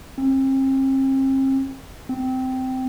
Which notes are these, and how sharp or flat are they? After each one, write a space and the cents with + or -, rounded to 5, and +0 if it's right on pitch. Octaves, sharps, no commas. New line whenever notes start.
C4 +40
C4 -15